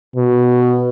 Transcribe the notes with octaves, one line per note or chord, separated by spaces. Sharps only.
B2